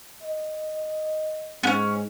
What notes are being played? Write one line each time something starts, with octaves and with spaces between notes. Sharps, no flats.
D#5
G#2 B3 C#4